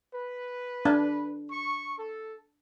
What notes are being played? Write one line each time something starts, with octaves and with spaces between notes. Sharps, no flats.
B4
D4
C#6
A4